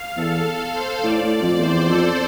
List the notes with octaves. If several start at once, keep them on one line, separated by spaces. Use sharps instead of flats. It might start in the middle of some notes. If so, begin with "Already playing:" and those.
Already playing: F5
E2 A4
A4
C5
A2 D5
A2
F2
E2 C5
F2 A4